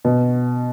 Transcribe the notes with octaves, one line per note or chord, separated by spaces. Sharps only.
B2